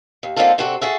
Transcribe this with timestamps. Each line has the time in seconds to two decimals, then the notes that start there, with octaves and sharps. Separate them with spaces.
0.23 D#2
0.36 D3 A#3 C4 D#4 F4 A4
0.58 C3 C4 D4 F#4 A4
0.81 F#4 G#4 A4 E5